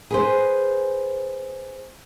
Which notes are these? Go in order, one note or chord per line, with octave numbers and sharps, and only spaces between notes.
G#4 B4 C5